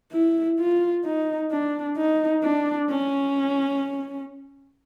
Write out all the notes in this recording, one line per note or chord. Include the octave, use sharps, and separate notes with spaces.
E4
F4
D#4
D4
D#4
D4
C#4